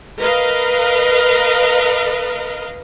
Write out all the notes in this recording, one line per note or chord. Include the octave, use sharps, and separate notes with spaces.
A#4 B4 D#5 F5